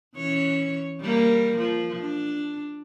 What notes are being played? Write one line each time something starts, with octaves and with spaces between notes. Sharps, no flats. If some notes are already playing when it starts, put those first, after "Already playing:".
E3 C#4 C#5
G3 A#3
F3
D4